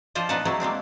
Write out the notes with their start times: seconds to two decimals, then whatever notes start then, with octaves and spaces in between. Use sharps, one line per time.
0.15 F3 D4 F4 C5 D#5
0.29 A#2 D4 D#4 B4 F#5 A5
0.45 F#3 G#3 D#4 E4
0.60 G#3 A#3 C4 D4